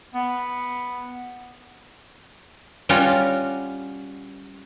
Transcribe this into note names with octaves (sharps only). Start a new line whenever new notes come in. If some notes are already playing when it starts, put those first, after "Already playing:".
B3
G3 C#4 F4 F#4